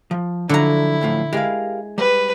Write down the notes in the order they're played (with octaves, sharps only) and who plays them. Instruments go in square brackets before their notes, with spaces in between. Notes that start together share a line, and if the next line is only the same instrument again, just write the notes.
[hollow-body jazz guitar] F3
[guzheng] D3 A#5 [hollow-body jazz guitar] F3 F#3 D4 [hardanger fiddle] E4
[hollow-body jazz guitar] F#2 A2 F3
[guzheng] G#3 [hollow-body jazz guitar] G4 A#4 F5
[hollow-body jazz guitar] G3 [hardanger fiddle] B4